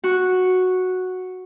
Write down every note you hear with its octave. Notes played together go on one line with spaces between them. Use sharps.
F#4